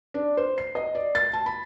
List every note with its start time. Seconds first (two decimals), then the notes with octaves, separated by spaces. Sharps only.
0.14 D4
0.37 C5
0.58 C7
0.75 D#5
0.95 D5
1.15 A6
1.33 A5
1.46 B5